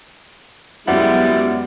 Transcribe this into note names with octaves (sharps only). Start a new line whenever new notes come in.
F#2 G3 G#3 B3 E4 F#5